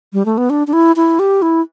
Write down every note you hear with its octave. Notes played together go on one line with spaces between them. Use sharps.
G3
A3
B3
D4
D4
E4
E4
G4
E4